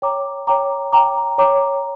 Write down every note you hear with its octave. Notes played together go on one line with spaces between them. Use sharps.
C#5 G5 A#5 D6
C#5 G5 A#5 D6
C#5 G5 A#5 D6
C#5 G5 A#5 D6